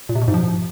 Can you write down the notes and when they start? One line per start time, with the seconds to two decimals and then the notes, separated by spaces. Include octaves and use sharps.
0.09 A#2
0.15 C3
0.22 B2
0.28 G#2
0.34 F3